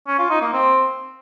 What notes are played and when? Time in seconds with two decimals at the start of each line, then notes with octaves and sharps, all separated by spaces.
0.07 C#4
0.19 F4
0.30 D#4
0.42 A#3
0.53 C4